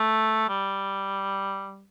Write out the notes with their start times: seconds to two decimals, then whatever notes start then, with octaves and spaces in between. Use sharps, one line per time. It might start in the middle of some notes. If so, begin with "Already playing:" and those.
Already playing: A3
0.49 G3